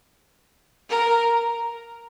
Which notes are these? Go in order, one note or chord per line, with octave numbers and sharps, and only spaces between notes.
A#4